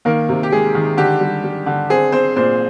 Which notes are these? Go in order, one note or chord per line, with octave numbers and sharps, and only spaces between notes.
D#3 A#3 A#4
C3
G4
G#3 G#4
D#3
D3 G4
G3
G3
D3
C4 G#4
C4 C5
A#2 C4 C5